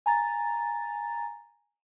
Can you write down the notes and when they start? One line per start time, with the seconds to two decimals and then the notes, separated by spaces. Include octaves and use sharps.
0.06 G#5 A#5 A6